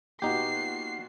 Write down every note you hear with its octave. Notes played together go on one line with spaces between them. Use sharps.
A#2 B3 D#4 F#4 G4 C7